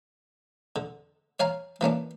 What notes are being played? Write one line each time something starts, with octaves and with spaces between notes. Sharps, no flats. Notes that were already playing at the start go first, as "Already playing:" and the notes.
D3
C#5 F5 G#5 A#5
E3 A#3 C#4 D4